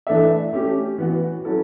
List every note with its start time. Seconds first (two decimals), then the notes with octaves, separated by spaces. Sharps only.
0.07 E3 A3 D4 A4 E5
0.53 A3 C#4 G4
0.98 E3 B3 F#4
1.45 F#3 C#4 E4 A4